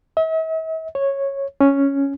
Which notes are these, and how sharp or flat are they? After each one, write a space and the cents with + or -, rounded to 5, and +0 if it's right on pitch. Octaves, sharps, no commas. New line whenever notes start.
E5 -45
C#5 -10
C#4 +0